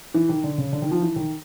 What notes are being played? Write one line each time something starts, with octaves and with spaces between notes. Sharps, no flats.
E3
D#3
D3
C#3
D3
D#3
F3
E3
D#3